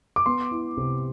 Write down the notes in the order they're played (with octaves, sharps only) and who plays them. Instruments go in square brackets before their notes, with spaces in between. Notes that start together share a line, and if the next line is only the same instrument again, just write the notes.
[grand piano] D6
B3 C6
E4
C3